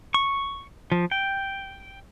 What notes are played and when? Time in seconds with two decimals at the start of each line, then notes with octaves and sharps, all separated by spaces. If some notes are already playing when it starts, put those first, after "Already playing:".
0.14 C#6
0.92 F3
1.11 G5